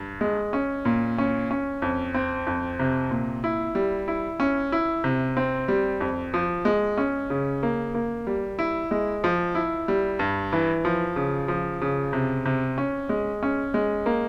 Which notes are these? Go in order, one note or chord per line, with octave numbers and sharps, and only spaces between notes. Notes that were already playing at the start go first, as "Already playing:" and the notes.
Already playing: G2
G#3
C#4
A#2
C#4
C#4
F2
C4
F2
C3
A#2
E4
G3
E4
C#4
E4
C3
C4
G3
F2
F3
G#3
C#4
C#3
A#3
A#3
G3
E4
G#3
F3
E4
G3
G2
E3
F3
C#3
F3
C#3
C3
C3
C#4
G#3
C#4
G#3
A#3